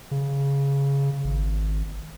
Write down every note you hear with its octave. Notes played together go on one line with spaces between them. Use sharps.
C#3
G#1